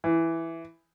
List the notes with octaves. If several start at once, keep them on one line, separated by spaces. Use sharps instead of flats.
E3